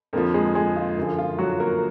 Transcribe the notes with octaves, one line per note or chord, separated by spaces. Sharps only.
F2 D3 F3 A#3 A#4
G#3 G#4
G#3 G#4
F4
F#2 D3 F3
F4
F#3 F#4
A#3 A#4